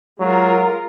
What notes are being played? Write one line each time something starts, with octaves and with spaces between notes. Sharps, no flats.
F#3 G#3 F4 A#4